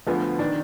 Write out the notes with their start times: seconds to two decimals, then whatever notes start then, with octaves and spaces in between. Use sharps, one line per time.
0.07 D2 D3 F3 B3
0.39 D#3 D4